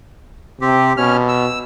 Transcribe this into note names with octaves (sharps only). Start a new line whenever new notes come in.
C3 C4 G4
B2 C#4 F6
E6